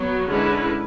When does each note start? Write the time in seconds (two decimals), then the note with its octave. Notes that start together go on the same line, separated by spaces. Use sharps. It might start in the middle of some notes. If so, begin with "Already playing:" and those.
Already playing: F#3 B3 F#4
0.27 D3 G#3 C#4 E4 B4